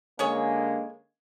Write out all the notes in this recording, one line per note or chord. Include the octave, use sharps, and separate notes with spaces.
D3 G#3 A#3 C#4 G#4 C#5